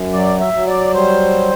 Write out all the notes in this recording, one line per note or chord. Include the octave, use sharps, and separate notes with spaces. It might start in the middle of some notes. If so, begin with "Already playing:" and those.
Already playing: F#2
F#3 D5
E5
F#3
D5
G3 C5